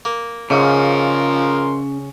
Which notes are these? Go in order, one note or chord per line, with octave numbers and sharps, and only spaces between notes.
A#3
G#2 C#3 F3 C#4 A#4 C6